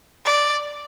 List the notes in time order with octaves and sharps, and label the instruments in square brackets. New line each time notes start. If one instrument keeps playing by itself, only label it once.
[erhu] D5